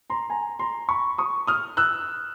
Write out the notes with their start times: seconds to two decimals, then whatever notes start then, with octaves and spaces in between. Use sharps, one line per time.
0.10 A#5 C6
0.30 G#5 A#5
0.59 A#5 C6
0.89 B5 C#6
1.18 C#6 D#6
1.47 D#6 F6
1.77 E6 F#6